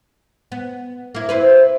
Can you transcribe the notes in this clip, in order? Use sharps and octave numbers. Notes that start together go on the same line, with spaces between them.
B3
A#3 E4
C4 E4 B4